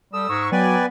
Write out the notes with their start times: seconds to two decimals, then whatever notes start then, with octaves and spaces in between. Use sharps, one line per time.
0.13 G3 A4 D#6 E6
0.29 G#2 C#6
0.52 F#3 B3 B4 D5 G5 G#5